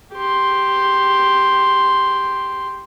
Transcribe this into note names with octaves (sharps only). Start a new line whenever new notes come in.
G4 C6